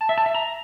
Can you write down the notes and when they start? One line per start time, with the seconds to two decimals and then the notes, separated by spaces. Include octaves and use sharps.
0.01 A5
0.09 E5
0.18 A5
0.26 E5
0.35 A#5